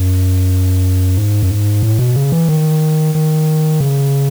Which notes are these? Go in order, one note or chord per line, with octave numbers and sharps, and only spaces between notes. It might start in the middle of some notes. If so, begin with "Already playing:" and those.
Already playing: F#2
G#2
F#2
G#2
A2
B2
C#3
E3
D#3
D#3
C#3